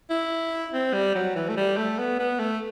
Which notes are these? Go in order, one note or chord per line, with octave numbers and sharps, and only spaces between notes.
E4
C4
G3
F#3
E3
A3
G3
A3
B3
B3
A3